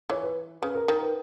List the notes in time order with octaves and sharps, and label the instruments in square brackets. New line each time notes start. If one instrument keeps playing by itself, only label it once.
[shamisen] E3 [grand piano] C#5
[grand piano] B4
[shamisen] C#3 [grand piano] B4
[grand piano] A#4
[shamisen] D#3 [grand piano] A#4
[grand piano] B4